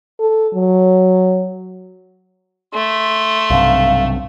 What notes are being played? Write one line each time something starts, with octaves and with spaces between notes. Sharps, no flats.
A4
F#3
A3 C6
B1 G2 C3 F5